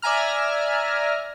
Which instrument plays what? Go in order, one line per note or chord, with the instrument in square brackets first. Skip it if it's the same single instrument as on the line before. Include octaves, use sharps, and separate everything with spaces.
[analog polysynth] D5 E5 G#5 A#5 F6